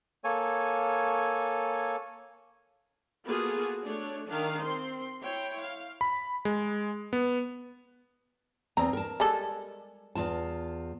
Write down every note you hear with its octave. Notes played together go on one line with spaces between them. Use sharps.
A#3 A4 C#5 G#5
A#3 B3 F4 F#4 G#4 A4
A3 D4 C#5
D#3 D4 F5
C4 C6
E4 C#5 G5 C6
F5
B5
G#3
B3
E2 C4 A#5
A#4 A5
G3 G#3 A4
E2 F4 A5